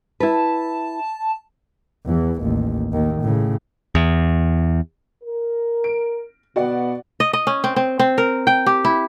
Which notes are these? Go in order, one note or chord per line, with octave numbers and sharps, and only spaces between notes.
E4 B4 A5
E2 E3
A1 D#2
D#2 D#3
A2 C#3
E2
A#4
D7
B2 B3 F#4 D5 F#5
D#5
D#5
C#4
C4
C4
C4
A#4
G5
G4
E4